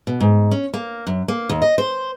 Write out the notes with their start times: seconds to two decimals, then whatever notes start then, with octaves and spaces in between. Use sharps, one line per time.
0.07 B2
0.20 G#2
0.51 C#4
0.74 A#3
1.07 F#2
1.28 A#3
1.49 D#2
1.62 D#5
1.78 C5